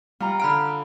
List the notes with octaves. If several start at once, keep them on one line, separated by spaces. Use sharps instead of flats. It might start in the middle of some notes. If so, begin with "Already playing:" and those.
G3 F4 A#5
D3 F5 B5 F6 D7